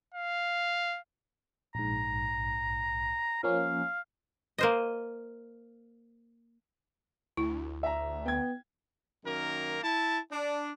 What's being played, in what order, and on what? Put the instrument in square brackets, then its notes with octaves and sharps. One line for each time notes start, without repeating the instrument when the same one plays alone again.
[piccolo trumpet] F5
[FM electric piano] A#1 G#2 [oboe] A#5
[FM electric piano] F3 A#3 C#4 [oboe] F5
[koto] A#3 C5 D#5
[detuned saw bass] D2 [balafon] E4
[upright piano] E5 A#5
[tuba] B3 [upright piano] G5 G#6
[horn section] F#2 D#3 A#3 A#4
E4 A5
D4